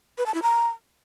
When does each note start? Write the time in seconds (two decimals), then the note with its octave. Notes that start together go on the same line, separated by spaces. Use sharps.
0.18 B4
0.26 A5
0.34 E4
0.42 A#5